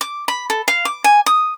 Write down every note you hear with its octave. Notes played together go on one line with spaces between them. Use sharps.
D6
B5
A4
F5
D6
G#5
D#6